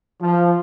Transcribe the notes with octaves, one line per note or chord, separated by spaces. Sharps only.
F3